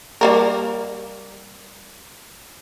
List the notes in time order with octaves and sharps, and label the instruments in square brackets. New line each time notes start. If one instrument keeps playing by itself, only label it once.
[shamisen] G3 A#3 A#4